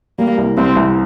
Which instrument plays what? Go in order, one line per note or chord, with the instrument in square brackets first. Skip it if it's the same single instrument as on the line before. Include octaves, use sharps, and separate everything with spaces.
[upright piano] G3 [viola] A#3
[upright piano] C2
[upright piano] C2 [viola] C4
[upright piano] C2